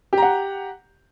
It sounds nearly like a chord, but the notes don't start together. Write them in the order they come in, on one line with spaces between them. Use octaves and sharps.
G4 A#5 F#5